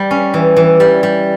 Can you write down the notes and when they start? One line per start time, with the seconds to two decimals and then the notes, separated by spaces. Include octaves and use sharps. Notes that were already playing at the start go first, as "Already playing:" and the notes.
Already playing: G3
0.11 C#4
0.34 E3
0.57 E3
0.80 G3
1.03 G3